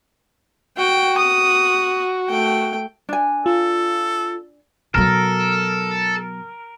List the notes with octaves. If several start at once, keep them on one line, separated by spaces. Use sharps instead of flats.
F#4 G5
D#6
A3 G5
D4 G#5
F4 A4
B2 F#3 A4 A#4